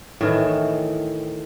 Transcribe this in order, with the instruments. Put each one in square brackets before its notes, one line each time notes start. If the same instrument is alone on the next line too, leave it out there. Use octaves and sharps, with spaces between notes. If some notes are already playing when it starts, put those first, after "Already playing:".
[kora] A2 D#3 E3